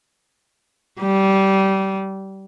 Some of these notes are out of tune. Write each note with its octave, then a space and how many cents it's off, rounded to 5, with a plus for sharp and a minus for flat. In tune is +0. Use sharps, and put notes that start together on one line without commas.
G3 -20